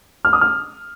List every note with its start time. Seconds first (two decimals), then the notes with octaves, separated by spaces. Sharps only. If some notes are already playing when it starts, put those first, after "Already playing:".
0.25 F6
0.33 D#6
0.41 F6